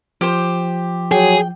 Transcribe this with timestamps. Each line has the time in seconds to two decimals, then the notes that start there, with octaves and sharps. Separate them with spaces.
0.21 F3 G4 C5
1.12 F#3 G#4 G5